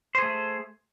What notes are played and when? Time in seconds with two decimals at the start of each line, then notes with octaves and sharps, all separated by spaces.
0.15 C5
0.19 G#4
0.22 A3